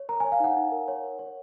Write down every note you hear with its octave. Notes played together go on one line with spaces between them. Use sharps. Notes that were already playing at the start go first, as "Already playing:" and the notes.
Already playing: C#5
A#4 A#5
C#5 G#5
F5
D#4 F#5
D#4
A#4
C#5
A#4
C#5